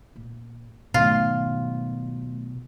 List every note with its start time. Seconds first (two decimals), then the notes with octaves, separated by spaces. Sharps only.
0.16 A#2
0.94 G#2 B2 D#3 F#3 A3 F4